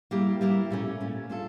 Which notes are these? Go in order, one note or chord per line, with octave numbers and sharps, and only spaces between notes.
G3 A#3 E4 G4 A#4
G3 A#3 E4 G4 A#4
A#2 A3 C#4
A#2 A3 C#4
A3 D4 F4 A4